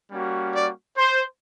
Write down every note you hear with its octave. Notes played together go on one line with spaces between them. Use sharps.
G3 A#3 C#4 F#4
D5
C5